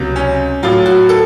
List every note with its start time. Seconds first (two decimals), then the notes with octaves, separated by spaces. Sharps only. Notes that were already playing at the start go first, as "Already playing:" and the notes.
Already playing: C#2 C3 F#3
0.16 C#4
0.63 A2 F#3 F4
0.86 F#4
1.09 A4